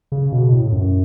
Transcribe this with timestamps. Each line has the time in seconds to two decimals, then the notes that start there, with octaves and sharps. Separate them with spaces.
0.12 C#3
0.32 B2
0.52 A2
0.72 F#2